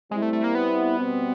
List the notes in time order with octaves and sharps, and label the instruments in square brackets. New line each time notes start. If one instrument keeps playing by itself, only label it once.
[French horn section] G3 C4 E4 [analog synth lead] G#3
[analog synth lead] A3
A3
A#3
B3
[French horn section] B2 G3 C4